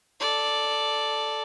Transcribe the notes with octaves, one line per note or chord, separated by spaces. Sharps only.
A4 D5